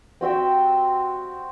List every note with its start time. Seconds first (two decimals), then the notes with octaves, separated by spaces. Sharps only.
0.21 C4 F#4 E5 G5